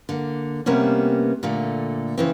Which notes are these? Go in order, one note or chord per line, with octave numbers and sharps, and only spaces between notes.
D3 A#3
C3 G3 A#3 B3 C#4
A#2 D3 A3
C#3 E3 C4